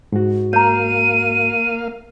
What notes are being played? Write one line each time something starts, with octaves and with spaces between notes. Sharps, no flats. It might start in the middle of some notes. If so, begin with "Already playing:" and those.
G#2 F#4
A#3 C#5 F5 A#5 D#7